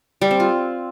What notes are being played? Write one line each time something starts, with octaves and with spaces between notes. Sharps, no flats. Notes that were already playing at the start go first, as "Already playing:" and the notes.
G3
C4
F4